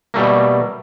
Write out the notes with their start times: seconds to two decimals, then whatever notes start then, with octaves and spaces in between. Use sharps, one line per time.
0.14 B2 G3 A3 A#3